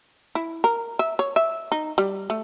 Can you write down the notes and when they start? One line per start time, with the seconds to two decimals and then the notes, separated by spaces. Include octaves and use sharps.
0.35 E4
0.64 A#4
0.99 E5
1.19 C#5
1.36 E5
1.72 D#4
1.98 G3
2.30 A3